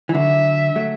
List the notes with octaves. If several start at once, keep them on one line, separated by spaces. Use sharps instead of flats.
E3
D3 F#3 E5
F#3 A3